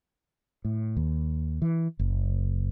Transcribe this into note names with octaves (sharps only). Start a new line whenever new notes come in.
A2
D#2
E3
F#1